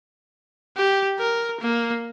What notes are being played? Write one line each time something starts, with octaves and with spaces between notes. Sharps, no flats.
G4
A#4
A#3